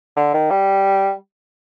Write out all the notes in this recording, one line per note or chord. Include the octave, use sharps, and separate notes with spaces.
D3
D#3
G3